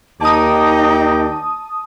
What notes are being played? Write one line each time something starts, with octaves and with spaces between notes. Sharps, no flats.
D#2 D#4 D5 G5 A5 D#6